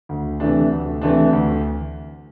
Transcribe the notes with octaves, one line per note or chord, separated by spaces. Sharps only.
D2
C3 E3 A3 D4
D2
C3 E3 A3 D4
D2